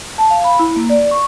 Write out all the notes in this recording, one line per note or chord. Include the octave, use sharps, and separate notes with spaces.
A5
F5
B5
E4
A#3
D5
C#6